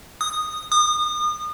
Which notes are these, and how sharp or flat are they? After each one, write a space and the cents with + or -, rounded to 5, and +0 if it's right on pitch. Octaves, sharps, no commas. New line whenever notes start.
D#6 -10
D#6 -35